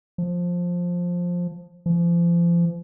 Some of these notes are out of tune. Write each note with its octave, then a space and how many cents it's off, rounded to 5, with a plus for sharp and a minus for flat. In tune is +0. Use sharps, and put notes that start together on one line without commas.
F3 +10
F3 -35